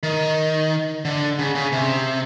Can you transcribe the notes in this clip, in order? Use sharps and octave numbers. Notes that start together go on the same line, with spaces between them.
D#3
D3
C#3
C#3
C3